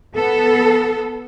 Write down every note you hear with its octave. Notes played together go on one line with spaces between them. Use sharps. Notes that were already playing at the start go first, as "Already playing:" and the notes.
B3 A4